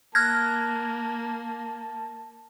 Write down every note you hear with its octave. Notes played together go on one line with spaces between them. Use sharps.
A#3 A5 F6 F#6 G#6 A#6